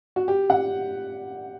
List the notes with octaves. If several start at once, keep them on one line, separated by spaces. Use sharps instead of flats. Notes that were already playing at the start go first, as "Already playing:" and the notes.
F#4
G4
F#5